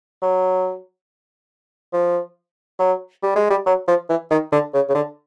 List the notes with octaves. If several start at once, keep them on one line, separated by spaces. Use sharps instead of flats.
F#3
F3
F#3
G3
G#3
G3
F#3
F3
E3
D#3
D3
C#3
C#3
D3